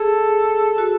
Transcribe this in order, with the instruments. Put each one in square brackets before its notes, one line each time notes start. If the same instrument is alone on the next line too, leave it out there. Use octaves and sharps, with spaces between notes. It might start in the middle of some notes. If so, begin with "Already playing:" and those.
Already playing: [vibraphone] G#4 [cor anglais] A4
[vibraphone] F#4